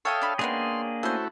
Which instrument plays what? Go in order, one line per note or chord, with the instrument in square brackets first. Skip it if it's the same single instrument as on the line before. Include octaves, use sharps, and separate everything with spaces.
[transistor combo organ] A4 E5 F5 [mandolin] C#5 G5 D#6
[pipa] D4 B5
[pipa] C#3 G#3 B3 [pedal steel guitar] A#3 D4 G#4 [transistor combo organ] C6
[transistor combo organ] A3 E4 F#4 [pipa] C#4 C5